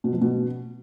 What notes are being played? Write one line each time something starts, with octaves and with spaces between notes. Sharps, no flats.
B2
F3
B2